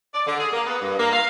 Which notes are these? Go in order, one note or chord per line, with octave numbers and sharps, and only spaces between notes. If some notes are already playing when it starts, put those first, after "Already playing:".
D5
D3
G#4
A#3
B3
G2
A#3
F5